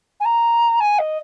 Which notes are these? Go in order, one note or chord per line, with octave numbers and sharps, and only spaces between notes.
G#5
A#5
G#5
D#5